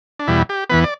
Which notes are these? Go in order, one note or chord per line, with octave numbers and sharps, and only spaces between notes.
D4
E2 B2 G3 E4
G4
E2 E3 B3 B4
D5